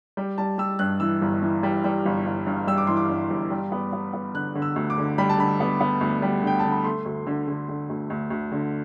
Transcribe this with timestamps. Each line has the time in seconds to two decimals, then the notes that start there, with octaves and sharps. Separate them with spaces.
0.17 G3 G5
0.38 G3 A5
0.58 G3 E6
0.79 G2 F#6
1.00 E3 E6
1.22 G1
1.43 E3
1.63 G3
1.84 G3
2.05 G1
2.26 G1
2.46 G2
2.67 G3 E6
2.78 D6
2.87 E3 C6
2.97 D6
3.09 G2
3.30 G1
3.50 G3
3.72 B3
3.93 B3
4.14 B3
4.34 D3 F#6
4.55 D3
4.62 E6
4.76 D2
4.90 D6
4.98 D3
5.18 G3 B5
5.30 A5
5.38 D3 B5
5.60 B3
5.81 B3
6.01 D2
6.22 G3
6.43 D3 G5
6.59 D3 A5
6.72 B5
6.84 A3 C6
7.06 D2
7.27 D3
7.48 D3
7.69 D3
7.90 D2
8.10 D2
8.30 D2
8.52 D3